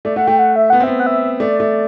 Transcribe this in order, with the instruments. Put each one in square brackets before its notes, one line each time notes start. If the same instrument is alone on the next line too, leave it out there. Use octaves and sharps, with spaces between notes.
[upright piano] A3 [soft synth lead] D5
[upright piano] A3 [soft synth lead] F#5
[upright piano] A3 [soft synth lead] G5
[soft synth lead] F#5
E5
[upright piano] B3 [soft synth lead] F#5
[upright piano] C4
[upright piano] B3 [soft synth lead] E5
[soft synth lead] F#5
E5
[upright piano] A3 [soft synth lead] D5
[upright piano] A3